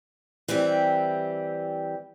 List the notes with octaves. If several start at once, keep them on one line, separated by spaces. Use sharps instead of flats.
E3 G3 C4 G4 E5